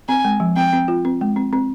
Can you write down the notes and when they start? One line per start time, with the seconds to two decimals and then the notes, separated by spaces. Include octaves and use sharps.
0.09 C4 G#5
0.25 G#3
0.40 F3
0.56 C4 G5
0.73 C4
0.88 F4
1.05 C4
1.21 G#3
1.36 C4
1.53 C4